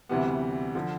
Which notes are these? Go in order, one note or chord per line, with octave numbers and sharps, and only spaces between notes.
D2 C3 E3 G3 B3
D3 F3